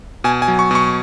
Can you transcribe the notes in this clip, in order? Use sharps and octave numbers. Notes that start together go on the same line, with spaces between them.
B2 G#5
G#5
F#3
C#6
B2 C#6